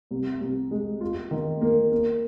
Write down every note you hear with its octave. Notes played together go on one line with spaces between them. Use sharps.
C2
C2
G#3
F4
D#3
A#3
A#3